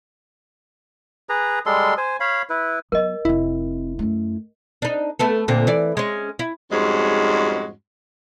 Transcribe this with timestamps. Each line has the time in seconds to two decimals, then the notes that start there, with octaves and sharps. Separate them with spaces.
1.29 G#4 B4 A#5
1.66 G3 G#3 A4 C6
1.98 C5 G#5
2.20 C#5 F5 B5
2.50 E4 B4
2.92 F#3 B3 A#4 D#5
3.25 F1 C4 E4
3.99 F#2 A3
4.82 D4 D#4
5.19 A3 B3 A4
5.48 A#2 D3 C4
5.67 E3 D5
5.97 G#3 C#4
6.39 E4
6.71 F2 G#2 G3 G#3 C#4 F#4